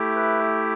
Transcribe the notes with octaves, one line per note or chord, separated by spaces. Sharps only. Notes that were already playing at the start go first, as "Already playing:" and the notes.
Already playing: A3 E4 G4
B4